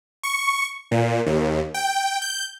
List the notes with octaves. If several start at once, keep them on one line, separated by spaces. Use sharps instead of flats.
C#6
A#2
D#2
G5
G6